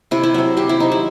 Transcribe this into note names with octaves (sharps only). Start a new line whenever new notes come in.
C3 E4
E4
F#3 C4 E4
C3 G4
E4
F#3 C4 D#4
E4